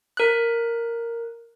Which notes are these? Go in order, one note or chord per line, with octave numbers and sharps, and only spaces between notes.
A#4 F#6